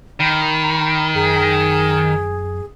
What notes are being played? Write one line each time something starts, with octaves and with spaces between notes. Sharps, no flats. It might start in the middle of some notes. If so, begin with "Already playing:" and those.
D#3 B5
F#2 G#4